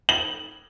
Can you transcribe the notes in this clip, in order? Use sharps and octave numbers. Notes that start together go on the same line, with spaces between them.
F#7